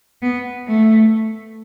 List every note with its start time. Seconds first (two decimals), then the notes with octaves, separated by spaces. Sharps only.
0.22 B3
0.67 A3